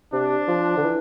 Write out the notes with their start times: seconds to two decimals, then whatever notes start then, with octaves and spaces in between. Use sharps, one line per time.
0.12 C3 D4
0.48 F3
0.77 D3
0.83 E3